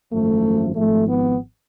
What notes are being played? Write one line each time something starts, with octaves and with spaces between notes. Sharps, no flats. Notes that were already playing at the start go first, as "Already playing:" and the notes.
G#1 F#2 F3 A3
G#1 G#2 F3 A3
B3